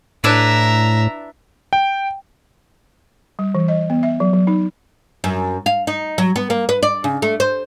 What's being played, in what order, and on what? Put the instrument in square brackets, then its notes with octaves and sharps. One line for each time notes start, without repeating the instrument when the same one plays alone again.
[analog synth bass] A2 [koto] D4 E4 B4 [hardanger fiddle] E5 A#5
[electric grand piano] G5
[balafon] G3
E3
D#5
B3
E5
F#3
F#3
D#4
[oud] F#2
F5
D#4
F#3
B3
A#3
B4
D5
C#3
A3
C5